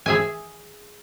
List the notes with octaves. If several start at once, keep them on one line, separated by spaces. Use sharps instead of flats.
G#4 E5 G#5